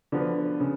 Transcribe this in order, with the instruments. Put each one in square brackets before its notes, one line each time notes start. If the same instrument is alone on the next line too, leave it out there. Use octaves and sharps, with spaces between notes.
[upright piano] D3 F3 B3 F#4 B4
C#3